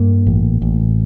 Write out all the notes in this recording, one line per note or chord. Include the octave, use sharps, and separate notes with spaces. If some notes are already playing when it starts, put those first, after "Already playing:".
Already playing: G2 A#3
A1
A1